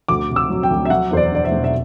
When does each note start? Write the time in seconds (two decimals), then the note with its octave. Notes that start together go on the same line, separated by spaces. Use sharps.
0.08 D2 D6
0.29 C3
0.36 E6
0.50 F#3
0.63 G5
0.71 D2
0.85 E5
0.90 F#3 F#5
1.11 E2 C5
1.17 D5
1.32 D3 D5
1.45 E5
1.52 E1
1.64 E5